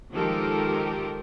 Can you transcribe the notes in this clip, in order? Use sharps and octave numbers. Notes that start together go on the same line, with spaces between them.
D#3 F3 G#3 G4 A4 A#4